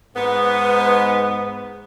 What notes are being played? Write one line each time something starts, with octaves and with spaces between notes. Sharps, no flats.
G#2 B3